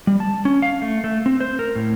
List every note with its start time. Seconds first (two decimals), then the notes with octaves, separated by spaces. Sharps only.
0.07 G3
0.20 A5
0.45 C#4
0.62 F5
0.82 A3
1.04 A3
1.26 C4
1.40 C5
1.59 A#4
1.76 A2